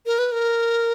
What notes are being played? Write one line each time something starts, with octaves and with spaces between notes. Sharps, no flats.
A#4
B4
A#4